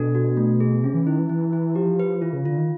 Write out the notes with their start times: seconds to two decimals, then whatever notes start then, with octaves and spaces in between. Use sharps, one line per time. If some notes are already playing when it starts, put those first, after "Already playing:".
Already playing: B2 D4 A4
0.15 F#4
0.37 A3
0.60 G#4
0.83 C3 C#4
0.94 E3
1.07 D#3 E4
1.19 E3
1.29 E3 E4
1.53 E4
1.75 F3 G4
2.00 B4
2.22 E3 F4
2.33 C#3
2.45 D3 F4
2.57 D#3